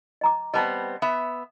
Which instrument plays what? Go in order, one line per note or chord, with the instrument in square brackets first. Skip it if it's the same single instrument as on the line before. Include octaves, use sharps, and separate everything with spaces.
[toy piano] D#5 A#5 D6
[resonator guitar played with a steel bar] G3 B3 C4 [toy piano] D#5 A5 B5
[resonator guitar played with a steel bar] B3 E5